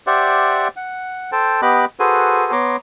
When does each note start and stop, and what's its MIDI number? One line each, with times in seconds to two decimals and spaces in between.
0.07 0.68 67
0.07 0.68 72
0.07 0.68 74
0.07 0.68 76
0.07 0.68 78
0.76 1.31 78
1.32 1.61 69
1.32 1.61 72
1.32 1.61 79
1.32 1.61 81
1.62 1.85 59
1.62 1.85 67
1.62 1.85 75
1.62 1.85 83
1.62 1.85 86
1.62 1.85 90
2.00 2.52 66
2.00 2.52 68
2.00 2.52 69
2.00 2.52 71
2.00 2.52 72
2.00 2.52 80
2.52 2.76 59
2.52 2.76 73
2.52 2.76 82
2.52 2.76 84
2.52 2.76 86